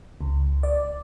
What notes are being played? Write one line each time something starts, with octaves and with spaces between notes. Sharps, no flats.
C#2
D5